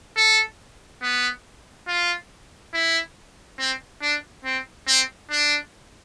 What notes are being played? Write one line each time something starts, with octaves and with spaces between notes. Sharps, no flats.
A4
B3
F4
E4
C4
D4
C4
C4
D4